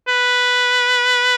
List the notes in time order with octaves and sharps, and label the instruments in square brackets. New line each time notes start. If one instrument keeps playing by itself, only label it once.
[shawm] B4